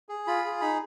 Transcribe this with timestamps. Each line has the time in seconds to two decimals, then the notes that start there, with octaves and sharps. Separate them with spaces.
0.09 G#4
0.27 F4 B5
0.45 G#4
0.61 D#4 B5